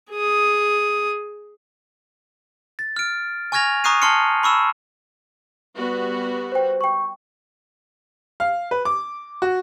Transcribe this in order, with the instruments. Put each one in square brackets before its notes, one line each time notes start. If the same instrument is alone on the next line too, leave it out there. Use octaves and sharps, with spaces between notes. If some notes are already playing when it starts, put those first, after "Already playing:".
[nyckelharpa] G#4 D#6
[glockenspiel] A6
F6 D7
G#5 C#6 F6 G#6 A#6 F7
A#5 C#6 D#6 F#6 C7 D#7
A5 C6 F6 C7 C#7
B5 C#6 E6 E7
[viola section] G3 B3 F#4
[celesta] C5 G5
G5 C#6
[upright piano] F5
B4
D6
F#4